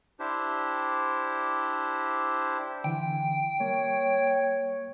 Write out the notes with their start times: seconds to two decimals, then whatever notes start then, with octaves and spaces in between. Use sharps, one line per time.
0.20 D4 E4 G4 C5
2.84 D3 E3 G5
3.60 G3 A#3 C#5